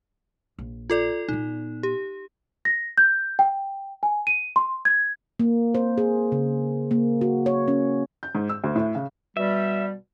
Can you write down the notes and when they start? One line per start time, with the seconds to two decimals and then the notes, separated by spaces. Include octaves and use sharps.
0.58 A#1
0.90 F4 A4 D5
1.29 A#2 B3 D#4
1.83 G4
2.65 A#6
2.98 G6
3.39 G5
4.03 G#5
4.27 D#7
4.56 C6
4.85 G#6
5.40 A#3
5.75 C5
5.98 G#4
6.32 C#3
6.91 A#3
7.21 F#4
7.46 C#5
7.68 C#4
8.23 G6
8.35 G#2
8.49 E6
8.64 D2
8.76 A2
8.95 C#3
9.37 B2 G3 E5